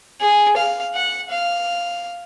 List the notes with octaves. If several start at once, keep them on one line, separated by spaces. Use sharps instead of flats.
G#4
F5
F#5
F5